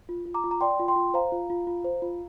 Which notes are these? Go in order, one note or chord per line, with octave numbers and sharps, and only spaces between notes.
F4
F4
A#5 D6
F4
A#5
D5 G5 C6
F4
G5 C6
F4
C5 F5 A#5
F4
F4
F4
C5
F4